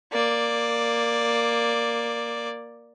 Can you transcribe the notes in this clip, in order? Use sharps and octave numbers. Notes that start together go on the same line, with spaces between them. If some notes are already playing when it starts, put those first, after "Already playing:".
A#3 D5